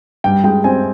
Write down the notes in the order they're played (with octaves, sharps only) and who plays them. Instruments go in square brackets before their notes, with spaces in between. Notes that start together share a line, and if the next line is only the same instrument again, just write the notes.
[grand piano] G2 G5
G#3 G5
C4 G#5